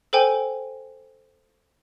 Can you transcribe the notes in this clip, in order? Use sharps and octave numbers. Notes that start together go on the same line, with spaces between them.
A4 C5 G5 G#5